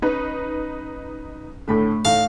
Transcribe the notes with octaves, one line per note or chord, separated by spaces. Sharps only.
C#4 D#4 B4
A2 D3 A3 B5
A2 D#4 F5